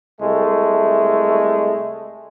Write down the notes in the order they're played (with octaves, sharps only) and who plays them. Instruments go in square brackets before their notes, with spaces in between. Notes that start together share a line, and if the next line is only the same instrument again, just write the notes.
[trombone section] C2 G#3 A3